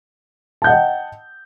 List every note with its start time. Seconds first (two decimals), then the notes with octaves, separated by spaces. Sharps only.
0.62 A5
0.64 G6
0.67 F#5
0.69 D#5
0.72 G5